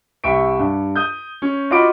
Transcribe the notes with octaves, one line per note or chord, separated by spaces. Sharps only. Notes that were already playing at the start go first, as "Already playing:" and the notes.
C2 E5 G5 C#6 D7
G2
D#6 G6
C#4
F4 F#4 D#5 B5 D6 D7